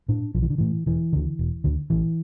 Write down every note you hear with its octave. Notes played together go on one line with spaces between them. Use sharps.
A2 D4
B1 F3
E3
D3
A2 E3
E1 E3
D2 D3
E1
D2 D3
A1 E3